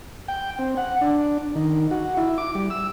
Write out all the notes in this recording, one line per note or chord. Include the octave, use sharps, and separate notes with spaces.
G5
C4
F#5
D4
D#3
F#4
E4
D6
G3
E6